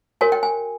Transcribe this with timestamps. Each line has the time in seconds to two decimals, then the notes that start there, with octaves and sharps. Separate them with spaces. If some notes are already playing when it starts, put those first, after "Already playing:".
0.21 F#4 A#4 C#5 G#5
0.32 G5
0.43 G#5